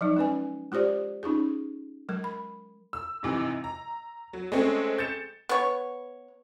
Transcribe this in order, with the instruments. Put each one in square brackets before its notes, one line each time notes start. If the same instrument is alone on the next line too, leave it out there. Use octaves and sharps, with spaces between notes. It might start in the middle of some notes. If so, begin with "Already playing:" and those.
[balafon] F3 F#3 D#4
G#3 C#4 B4 G#5
G#3 F4 G4 C5 D5
C#4 D#4 F4 G#4
F#3 G#3 A#4
B5
[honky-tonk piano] E6
G#2 C3 E3
A#5
F#3
G#3 A3 C4 C#4
G6 A6 C#7 E7
[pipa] B3 C#5